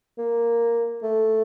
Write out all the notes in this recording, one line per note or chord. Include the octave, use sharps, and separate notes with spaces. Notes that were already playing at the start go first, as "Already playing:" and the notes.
A#3
A3